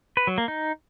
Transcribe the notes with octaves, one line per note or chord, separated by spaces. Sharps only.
B4
F#3
A#3
D#4